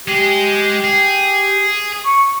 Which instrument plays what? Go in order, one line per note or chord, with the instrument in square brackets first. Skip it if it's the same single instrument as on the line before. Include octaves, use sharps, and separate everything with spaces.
[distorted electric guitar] G#3 G#4 [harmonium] G4
[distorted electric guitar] G#4
[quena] C#6